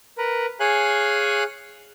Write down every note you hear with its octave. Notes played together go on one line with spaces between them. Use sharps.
A#4 B4
G#4 C#5 F5 G#5 F#6